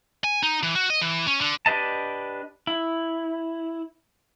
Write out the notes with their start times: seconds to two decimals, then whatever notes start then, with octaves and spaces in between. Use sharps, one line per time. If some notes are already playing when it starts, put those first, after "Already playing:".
0.24 G#5
0.43 D#4
0.63 E3
0.75 F#4
0.90 D#5
1.01 E3
1.27 C#4
1.41 D3
1.66 D4 G4 B4 D#5 A5
2.67 E4